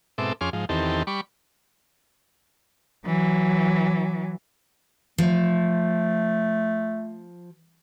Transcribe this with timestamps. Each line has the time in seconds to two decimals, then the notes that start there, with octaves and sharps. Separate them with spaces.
0.18 G#2 B2 C4 A4 E5 D6
0.41 F2 C#4 G#4 C6 D6 F6
0.53 G#2 F3
0.69 E2 D#3 C4 G4 A4
1.07 G3 B5 C#6 D6
3.06 E3 F#3
5.18 F3 A3